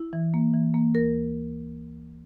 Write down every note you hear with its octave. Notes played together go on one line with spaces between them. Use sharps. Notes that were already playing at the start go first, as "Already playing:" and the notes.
Already playing: E4
E3
A#3
E3
A#3
D2 A#4